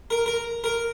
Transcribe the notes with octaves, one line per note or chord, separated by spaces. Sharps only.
A#4
A#4
A#4